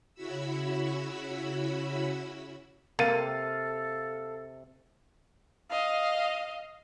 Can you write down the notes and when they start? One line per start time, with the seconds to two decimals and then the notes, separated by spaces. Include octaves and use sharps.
0.14 C#3 C#4 E4 F#4 B5 E6
2.99 C3 A#3 A4 F5 A6 D#7
5.70 D#5 F5